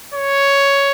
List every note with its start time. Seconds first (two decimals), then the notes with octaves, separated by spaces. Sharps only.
0.14 C#5